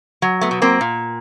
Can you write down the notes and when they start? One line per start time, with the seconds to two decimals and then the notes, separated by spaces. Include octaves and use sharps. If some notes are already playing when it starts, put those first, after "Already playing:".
0.22 F#3
0.41 A3 B3
0.51 B2
0.62 A#3 C4
0.81 A#2